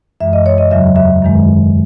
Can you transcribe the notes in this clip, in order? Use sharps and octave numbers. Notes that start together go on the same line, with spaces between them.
F#2 E3 G#3 E5
D#5
C#5
D#5
E2 C#3 F#3 E5
E5
F#2 D#3 G#3